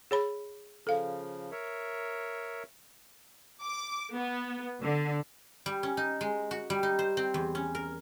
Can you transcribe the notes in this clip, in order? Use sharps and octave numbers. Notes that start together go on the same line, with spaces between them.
G#4 C#5 B5
C#3 F3 A4 F5
A#4 C#5 E5
D6
B3
D3
G3
C#4
D#4
G#3
F#4
G3
D#4
C5
C4
E2
C#4
A#4